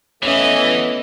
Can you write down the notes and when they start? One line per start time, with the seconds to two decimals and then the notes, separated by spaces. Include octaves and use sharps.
0.23 E3 A3 B3 C#4 C#5 D#5 E5